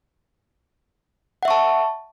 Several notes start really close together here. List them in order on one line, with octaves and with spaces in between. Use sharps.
F#5 E5 C#6 A5